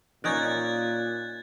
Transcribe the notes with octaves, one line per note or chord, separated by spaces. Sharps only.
A#2 C#4 D#4 D5 F#6 G#6 A6